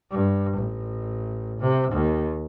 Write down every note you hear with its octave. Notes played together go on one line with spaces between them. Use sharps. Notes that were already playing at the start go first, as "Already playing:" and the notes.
G2
A1
C3
D#2